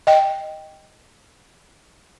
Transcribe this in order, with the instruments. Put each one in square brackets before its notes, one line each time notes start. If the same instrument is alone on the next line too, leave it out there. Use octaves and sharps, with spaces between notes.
[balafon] D#5 G5